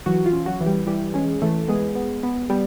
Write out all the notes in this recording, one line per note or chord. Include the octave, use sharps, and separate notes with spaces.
E3 F#3 F#4
F4
C#4
F#3 F#4
E3
G3 G4
E3 G3 G4
G#3 C#4 G#4
E3 A3 A4
G#3 B3 G#4
B3
B3
G3 B3 G4